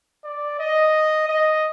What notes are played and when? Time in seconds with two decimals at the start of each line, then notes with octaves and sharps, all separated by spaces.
0.25 D5
0.60 D#5
1.29 D#5